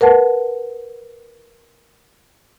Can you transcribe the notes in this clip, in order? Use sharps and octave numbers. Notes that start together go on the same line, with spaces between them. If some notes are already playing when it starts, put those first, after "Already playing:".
A#4 B4 F#5 A5